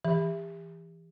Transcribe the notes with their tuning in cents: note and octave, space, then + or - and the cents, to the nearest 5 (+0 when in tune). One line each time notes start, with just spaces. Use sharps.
E3 +10 G4 +35 B5 +0